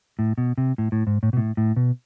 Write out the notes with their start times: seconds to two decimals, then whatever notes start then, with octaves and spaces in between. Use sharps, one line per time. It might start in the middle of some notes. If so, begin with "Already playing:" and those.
0.19 A2
0.38 B2
0.58 C3
0.78 A2
0.92 A2
1.07 G#2
1.23 A2
1.33 B2
1.37 A2
1.57 A2
1.76 B2